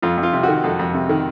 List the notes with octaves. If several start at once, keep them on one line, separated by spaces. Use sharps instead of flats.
F2 F4
F2
F4
C3
D#3 F#4
F2 A4
F2
C3
D#3